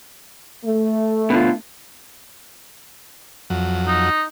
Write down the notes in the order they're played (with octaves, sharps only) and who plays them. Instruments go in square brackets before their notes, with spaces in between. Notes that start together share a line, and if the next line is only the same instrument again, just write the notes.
[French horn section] A3
[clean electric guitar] B2 D3 F4
[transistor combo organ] F2 F#3
[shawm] D#4